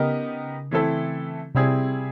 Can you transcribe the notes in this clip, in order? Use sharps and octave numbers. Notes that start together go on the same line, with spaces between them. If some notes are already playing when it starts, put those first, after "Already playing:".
Already playing: C#3 B3 D#4 G4 A#4 D#5
E3 A3 C4 E4 A4
C3 G3 C4 E4 G#4